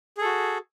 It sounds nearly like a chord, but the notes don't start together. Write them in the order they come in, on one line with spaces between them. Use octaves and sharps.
G#4 A4 F#4